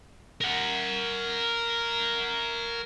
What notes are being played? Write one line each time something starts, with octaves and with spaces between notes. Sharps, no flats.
A#4 F#5